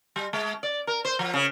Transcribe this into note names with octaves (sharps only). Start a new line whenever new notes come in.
G3
G#3
D5
A#4
C5
F3
C#3